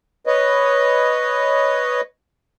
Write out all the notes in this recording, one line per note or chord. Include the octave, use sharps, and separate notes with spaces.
B4 C#5 D#5